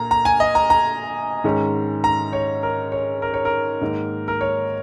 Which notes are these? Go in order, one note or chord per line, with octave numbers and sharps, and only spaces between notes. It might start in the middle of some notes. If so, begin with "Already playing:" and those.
Already playing: A#2 A#3 A#5
A#5
G#5
D#5
A#5
A#5
G#2 D#3 G#3 C#4
A#5
C#5
A#4
C#5
A#4
C#5
A#4
G#2 D#3 A#3
A#4
C#5